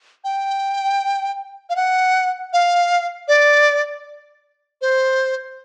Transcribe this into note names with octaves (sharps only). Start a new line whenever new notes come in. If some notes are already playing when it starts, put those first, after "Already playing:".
G5
F5
F#5
F5
D5
C5